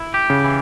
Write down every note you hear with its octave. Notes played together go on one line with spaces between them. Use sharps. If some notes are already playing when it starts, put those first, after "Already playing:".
Already playing: E4
G4
C#3
E3